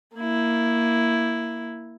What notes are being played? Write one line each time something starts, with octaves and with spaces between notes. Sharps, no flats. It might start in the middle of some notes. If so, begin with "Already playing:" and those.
A#3 E4